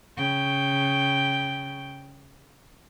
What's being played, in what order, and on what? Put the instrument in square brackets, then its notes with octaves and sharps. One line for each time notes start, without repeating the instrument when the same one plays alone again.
[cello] C#3 G5